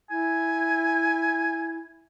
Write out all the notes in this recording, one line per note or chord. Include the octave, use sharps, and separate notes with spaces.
E4 G#5